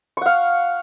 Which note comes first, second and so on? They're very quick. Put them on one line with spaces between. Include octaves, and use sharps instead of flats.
C#6 F#5 F5